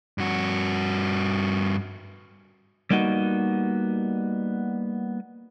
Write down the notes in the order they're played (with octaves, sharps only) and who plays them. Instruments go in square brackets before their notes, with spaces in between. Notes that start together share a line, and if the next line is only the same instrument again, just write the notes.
[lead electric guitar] G2 F#4
[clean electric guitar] G3 A#3 B3 D#4 F#4